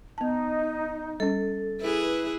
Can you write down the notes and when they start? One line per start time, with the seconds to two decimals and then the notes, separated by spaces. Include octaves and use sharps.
0.18 B3 D#4 A5
1.20 G3 C#4 A4
1.80 E4 G#4 B4